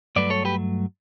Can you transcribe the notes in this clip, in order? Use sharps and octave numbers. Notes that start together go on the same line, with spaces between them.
G2 F#3 A3 B4 D5
A4 C#5
G4 B4